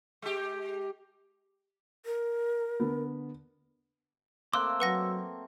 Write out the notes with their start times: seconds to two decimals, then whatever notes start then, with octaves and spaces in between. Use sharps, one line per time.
0.22 G#3 G4
2.06 A#4
2.80 D3 B3
4.54 A3 A#3 C4 C6 D6 E6 F#6
4.80 F#3 C4 B4 F#5 A#6